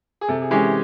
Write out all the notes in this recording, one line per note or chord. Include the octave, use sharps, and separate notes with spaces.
G#4
C3 A4
G#4
E3 G#3 C#4 G4